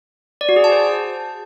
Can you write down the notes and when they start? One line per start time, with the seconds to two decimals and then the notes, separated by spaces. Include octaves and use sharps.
0.41 D5
0.49 F#4
0.56 G#4
0.64 A5
0.72 C5